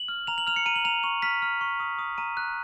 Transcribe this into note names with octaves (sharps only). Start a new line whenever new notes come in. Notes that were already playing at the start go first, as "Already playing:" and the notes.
Already playing: F#7
F6
A#5 F7
F#7
F6 F7
C#7
A#5 D#7
F#7
A#5 F7
C#6 F7
F6 B6
F6
C#6
D#6
D#6
A#5 D#7
F#6